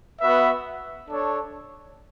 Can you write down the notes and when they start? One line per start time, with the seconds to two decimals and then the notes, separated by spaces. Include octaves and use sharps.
0.21 B3 F#4 B4 E5
1.08 D4 A4 C#5